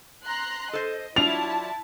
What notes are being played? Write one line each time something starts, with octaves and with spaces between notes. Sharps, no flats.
A#5 C6 F#6
A4 C5 D#5
F#3 D4 E4 F4 A5 F7